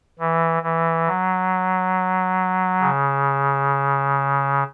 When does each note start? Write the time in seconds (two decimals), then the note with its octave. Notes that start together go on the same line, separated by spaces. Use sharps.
0.19 E3
0.62 E3
1.07 F#3
2.81 C#3